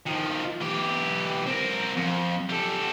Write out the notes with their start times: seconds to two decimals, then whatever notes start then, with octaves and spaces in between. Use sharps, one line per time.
0.07 D#3 F3
0.61 E3 G4
1.46 C4 A#4
1.97 F2
2.49 G3 A4